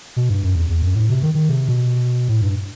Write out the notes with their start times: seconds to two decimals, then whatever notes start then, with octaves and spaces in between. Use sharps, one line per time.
0.16 B2
0.29 G2
0.43 F#2
0.55 E2
0.69 E2
0.82 F#2
0.95 A2
1.09 C3
1.22 D#3
1.35 D#3
1.49 C3
1.69 B2
2.28 A2
2.41 G2